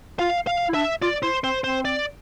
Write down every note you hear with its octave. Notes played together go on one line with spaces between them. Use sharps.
F4 F5
F5
E4
D4 E5
F4 D5
E4 C5
C4 C5
C4 C5
D5